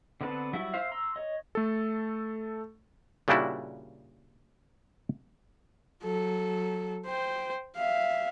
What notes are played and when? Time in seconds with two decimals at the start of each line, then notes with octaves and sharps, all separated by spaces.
0.21 D3 B3 C4 B4 A5
0.53 F#3 G3 E4 F#4 E5
0.74 C5 E5 F5
0.92 A#5 C6 E6
1.16 C#5 D#5
1.55 A3 A4
3.28 A#2 C#3 G3 D4 E4 F#4
6.03 F#3 A4
7.06 C5 G5
7.76 E5 F5